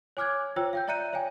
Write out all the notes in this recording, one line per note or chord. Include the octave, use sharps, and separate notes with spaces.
C#5 G#5 D6 F6 F#6 G#6
F4 C5 C#5 G5 E6
F5 G5 G6
D5 E5 A#5 F#6 C#7 D#7
C#5 F5 G5 G#5